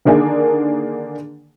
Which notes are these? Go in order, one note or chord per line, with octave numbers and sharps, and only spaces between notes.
D3 D#3 A#3 D4 G#4